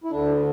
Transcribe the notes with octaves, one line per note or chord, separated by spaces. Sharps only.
E4
D2 D3 D4